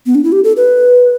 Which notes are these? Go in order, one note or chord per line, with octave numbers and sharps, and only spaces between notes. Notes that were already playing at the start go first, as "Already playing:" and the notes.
B3
D4
E4
G4
A4
B4